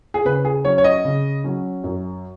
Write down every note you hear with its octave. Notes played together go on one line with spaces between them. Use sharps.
G#4
C#3 B4
G#4
F#3 C#4 C#5
C#5
D#5
C#3
F#3 C#4
F#2